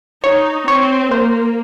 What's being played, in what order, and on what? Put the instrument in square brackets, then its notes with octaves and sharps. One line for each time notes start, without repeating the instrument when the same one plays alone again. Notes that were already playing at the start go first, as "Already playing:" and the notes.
[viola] D#4 [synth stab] C#5
[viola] C4 [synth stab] C#5
[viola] A#3 [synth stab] C5